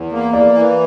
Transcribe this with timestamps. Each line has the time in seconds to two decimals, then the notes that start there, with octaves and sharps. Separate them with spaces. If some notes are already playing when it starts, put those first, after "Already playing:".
Already playing: E2
0.12 A#3
0.33 E3 D5
0.54 E3